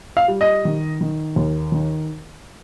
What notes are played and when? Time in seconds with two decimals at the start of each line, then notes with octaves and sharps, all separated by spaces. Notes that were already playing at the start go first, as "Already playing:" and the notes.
0.17 F5
0.28 G3
0.41 D#5
0.65 D#3
1.01 D#3
1.36 D#2
1.72 D#3